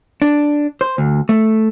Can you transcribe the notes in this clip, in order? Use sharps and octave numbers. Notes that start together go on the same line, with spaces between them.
D4
C5
D2
A3